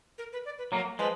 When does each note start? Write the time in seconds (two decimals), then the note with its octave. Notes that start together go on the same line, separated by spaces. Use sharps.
0.18 A#4
0.33 B4
0.45 D5
0.58 B4
0.72 F#3 A#3 A#4
0.99 F3 G#3 B4